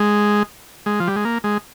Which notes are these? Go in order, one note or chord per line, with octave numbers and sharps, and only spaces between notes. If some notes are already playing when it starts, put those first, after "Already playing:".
Already playing: G#3
G#3
F3
G3
G#3
A#3
G#3